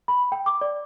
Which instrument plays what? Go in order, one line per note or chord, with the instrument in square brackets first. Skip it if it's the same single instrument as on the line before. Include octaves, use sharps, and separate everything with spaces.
[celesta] B5
G5
D6
D5